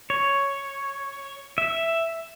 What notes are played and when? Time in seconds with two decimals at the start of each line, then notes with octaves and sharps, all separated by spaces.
0.10 C#5
1.58 E5